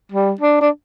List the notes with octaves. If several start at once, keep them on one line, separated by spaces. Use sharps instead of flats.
G3
D4
D4